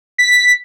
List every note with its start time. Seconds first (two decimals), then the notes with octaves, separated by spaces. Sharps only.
0.18 B6